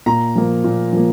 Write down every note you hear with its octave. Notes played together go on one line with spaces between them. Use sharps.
A#2 A#5
F3 A#3
A#2
F3 A#3